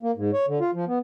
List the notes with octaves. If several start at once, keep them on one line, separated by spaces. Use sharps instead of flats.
A#3
G#2
C#5
D3
F4
F3
B3